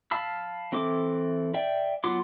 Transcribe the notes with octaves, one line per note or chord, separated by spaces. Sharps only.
F5 A5 B5 E6
E3 C4 E4 A4 D6
D5 E5 G5
F#3 B3 F4 C6 D6